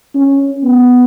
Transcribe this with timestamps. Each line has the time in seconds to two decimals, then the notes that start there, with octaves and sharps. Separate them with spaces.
0.15 C#4
0.63 B3